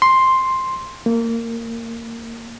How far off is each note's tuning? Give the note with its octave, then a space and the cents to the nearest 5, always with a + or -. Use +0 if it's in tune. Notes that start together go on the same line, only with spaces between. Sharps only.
C6 +5
A#3 -20